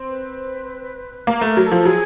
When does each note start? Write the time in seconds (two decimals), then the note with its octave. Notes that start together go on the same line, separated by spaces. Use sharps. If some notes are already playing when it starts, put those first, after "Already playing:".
Already playing: C4
0.09 B4
1.27 A#3 A#4
1.41 A3
1.46 A#4
1.57 F#3
1.66 A4
1.72 F3
1.85 F#3 G#4